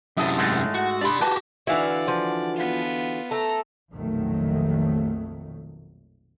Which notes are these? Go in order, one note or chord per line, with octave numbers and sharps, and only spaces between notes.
F#2 C3 E4 A4 D#5
G#2 G#3 A3
F#4
D4 G4 D5 B5 C6
F#4 G4 B4 A5
D3 E3 E4 F#4 D5 F5
F3
B3 F4
A3 A4 A#5
A#1 F2 B2 D#3 F#3 A3